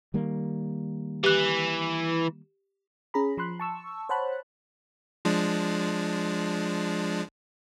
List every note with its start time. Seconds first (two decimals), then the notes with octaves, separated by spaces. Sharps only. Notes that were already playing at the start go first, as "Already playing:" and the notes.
0.14 D#3 G3 A#3
1.24 E3 G4 F#6
3.14 C#4 G#4 A#5 B5
3.37 F3 B5 C6 F#6
3.60 A5 C#6 E6
4.09 C5 C#5 F#5 A5 B5 F#6
5.25 F3 G#3 D4